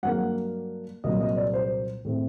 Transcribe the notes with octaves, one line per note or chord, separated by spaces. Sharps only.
G2 F#3 A#3 F#5
C2 A#2 F#3 A#3 D#5
D#5
D5
C5
A2 A3 C4